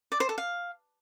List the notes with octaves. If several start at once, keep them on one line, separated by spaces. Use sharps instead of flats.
D5
C5
A4
F5